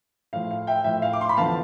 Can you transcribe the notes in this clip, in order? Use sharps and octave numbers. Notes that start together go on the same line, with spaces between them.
A2 F3 F5
F5
E5 G5
A2 F3 E5 G5
F5
D6
C6
B5
E2 D3 F3 F5 A5